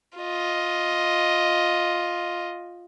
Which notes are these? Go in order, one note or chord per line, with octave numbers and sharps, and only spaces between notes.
F4 D#5